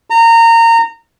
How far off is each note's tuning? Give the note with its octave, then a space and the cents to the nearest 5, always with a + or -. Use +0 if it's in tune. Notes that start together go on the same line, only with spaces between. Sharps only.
A#5 -25